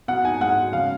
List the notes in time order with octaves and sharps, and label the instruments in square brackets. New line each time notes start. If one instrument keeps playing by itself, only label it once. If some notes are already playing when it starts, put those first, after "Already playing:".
[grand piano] B2 [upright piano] F#5
[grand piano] D#4 [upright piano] G#5
[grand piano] G#3 [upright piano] F#5
[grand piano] B2
[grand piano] C#3 [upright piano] F5